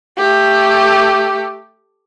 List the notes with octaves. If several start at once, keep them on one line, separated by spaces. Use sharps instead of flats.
A3 G4